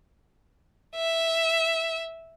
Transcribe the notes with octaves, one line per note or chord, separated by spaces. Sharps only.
E5